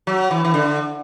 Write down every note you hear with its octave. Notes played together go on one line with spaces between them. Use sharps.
F#3
E3
E3
D3